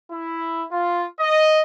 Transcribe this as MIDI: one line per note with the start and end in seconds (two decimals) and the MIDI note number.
0.11 0.63 64
0.72 1.03 65
1.19 1.61 75